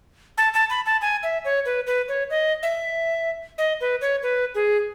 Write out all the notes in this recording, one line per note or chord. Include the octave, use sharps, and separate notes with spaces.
A5
A5
B5
A5
G#5
E5
C#5
B4
B4
C#5
D#5
E5
D#5
B4
C#5
B4
G#4